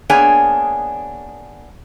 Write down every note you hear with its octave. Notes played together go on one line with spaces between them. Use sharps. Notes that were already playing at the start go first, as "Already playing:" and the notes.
A#3 B3 D4 G#4 C#5 G#5